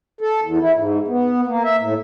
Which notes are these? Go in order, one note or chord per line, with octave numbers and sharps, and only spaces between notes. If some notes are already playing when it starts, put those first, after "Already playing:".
A4
E2
E4
G#2
B3
A#3
E5
A2